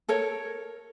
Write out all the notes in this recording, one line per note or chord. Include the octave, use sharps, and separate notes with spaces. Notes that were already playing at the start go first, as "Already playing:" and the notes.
A4 A#4 C#5